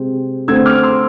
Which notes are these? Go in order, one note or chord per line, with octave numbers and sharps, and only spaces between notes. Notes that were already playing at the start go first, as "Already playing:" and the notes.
Already playing: C3 G#3 C4
D3 A3 C4 E6 G#6
D6 F6
C6 E6